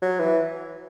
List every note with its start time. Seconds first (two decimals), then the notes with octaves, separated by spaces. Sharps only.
0.02 F#3
0.20 E3